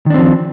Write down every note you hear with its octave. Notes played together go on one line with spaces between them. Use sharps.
D#3 F3 C4 D4